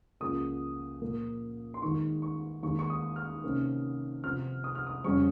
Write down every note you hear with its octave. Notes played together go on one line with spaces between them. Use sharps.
C#2 C#3 F3 A#3 F4 D#6
A#2 F3 A#3
C6
D#2 D#3 G#3 D#4 C#6
C#6
D#2 D#3 G#3 C#6
C#6
D#6
F6
C3 D#3 A#3 C#4
C3 F3 C4 F4 F6
D#6
F6
D#6
F2 C#3 G3 C#4 C#6